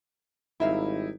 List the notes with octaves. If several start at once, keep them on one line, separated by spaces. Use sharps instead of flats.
G#1 G3 D#4 E4 A#4 E5 F5